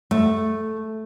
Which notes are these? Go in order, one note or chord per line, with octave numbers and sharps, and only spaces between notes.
A3